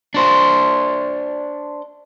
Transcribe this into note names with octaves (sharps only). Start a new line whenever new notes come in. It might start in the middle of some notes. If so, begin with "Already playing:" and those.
D4 C5